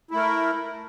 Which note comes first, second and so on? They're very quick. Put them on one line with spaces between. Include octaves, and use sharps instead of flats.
E4 A3 A#4